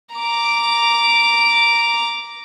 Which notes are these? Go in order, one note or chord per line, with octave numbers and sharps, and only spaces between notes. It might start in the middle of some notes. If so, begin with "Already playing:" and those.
A#5 D6